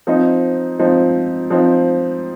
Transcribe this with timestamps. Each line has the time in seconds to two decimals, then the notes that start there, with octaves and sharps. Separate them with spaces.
0.07 F3 C4 D#4
0.79 F3 C4 D#4
1.50 F3 C4 D#4